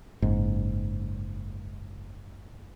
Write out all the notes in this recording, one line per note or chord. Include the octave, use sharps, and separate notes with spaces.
F#1 G#2